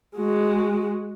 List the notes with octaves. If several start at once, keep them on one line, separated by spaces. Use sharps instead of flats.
G#3 F#4